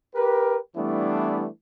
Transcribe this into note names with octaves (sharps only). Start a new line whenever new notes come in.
G4 A#4 B4
E3 G3 A3 B3 D4 E4